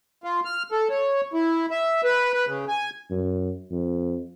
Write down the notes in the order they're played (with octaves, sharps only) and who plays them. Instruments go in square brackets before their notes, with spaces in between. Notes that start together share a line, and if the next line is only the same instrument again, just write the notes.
[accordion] F4
F6
A4
C#5
E4
E5
B4
B4
C#3
G#5
[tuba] F#2
F2